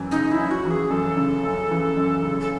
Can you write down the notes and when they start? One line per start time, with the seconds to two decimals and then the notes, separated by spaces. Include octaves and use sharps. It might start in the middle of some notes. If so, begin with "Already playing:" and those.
Already playing: F#2 E3
0.11 C#3 D#4
0.31 E4
0.39 F#2
0.51 F#4
0.65 E3
0.71 G#4
0.90 F#2 A4
1.17 C#3
1.44 F#2
1.70 E3
1.97 F#2
2.23 C#3
2.40 A4